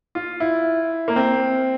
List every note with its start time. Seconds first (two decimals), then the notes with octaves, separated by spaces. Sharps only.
0.15 F4
0.40 E4
1.08 A#3
1.16 C4